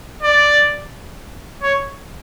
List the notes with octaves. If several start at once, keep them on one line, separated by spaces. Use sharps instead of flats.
D5
C#5